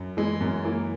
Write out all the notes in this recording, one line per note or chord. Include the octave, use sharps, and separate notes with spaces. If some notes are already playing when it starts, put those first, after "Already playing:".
Already playing: F#2
E3 G#3
F#2
E3 A#3